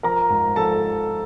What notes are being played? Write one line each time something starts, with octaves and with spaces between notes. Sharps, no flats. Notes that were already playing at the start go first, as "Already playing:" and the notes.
F3 A#4 A#5
G#2
F3 A4 A5